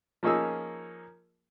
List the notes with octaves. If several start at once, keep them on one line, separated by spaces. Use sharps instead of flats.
F3 A#3 C#4 D#4 G#4 E6